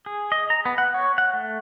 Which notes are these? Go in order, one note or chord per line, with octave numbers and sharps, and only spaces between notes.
G#4
D#5
A#5
B3
F#5
C#5
F#5
A3